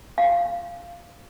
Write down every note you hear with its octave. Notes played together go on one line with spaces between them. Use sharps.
F5